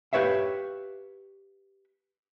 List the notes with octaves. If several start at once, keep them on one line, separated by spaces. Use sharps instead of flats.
G4 B4 C#5 E5 F5